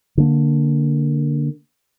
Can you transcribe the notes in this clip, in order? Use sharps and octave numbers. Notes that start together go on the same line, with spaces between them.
D3 A#3